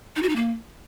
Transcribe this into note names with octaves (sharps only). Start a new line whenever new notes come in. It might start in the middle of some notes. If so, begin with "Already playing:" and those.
D#4
F#4
D#4
A#3